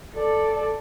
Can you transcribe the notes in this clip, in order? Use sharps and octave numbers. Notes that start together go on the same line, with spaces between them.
A4 D5